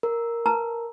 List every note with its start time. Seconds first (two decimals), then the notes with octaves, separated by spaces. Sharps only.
0.03 A#4
0.46 B4 A5 A#5